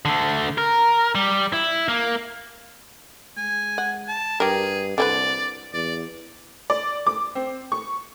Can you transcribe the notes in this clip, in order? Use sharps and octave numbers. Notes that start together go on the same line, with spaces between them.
D3 A3
A#4
G3
E4
A#3
G#3 G#5
F#5
A5
G2 G4 G#4 A#4
C2 D3 C#4 B4 D5
E2 D5
D5
D6
C4
C#6